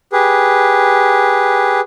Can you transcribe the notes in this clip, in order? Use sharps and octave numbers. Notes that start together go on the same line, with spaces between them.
G4 G#4 B4